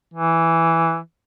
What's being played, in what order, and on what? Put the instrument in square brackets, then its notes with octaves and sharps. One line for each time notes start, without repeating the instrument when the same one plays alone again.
[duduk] E3